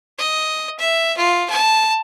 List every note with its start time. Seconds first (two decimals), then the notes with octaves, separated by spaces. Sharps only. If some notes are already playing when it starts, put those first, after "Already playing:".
0.18 D#5
0.79 E5
1.17 F4
1.50 A5